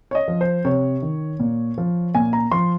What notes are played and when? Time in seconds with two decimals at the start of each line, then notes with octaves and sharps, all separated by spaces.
0.11 C#5
0.15 D#5
0.28 F3
0.41 C5
0.65 C3 C#5
1.02 D#3
1.40 A#2
1.78 F3
2.15 A#2 G#5
2.33 A#5
2.51 F3 C6